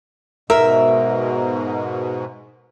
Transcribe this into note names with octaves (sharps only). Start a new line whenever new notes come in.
G#2 B2 A#4 E5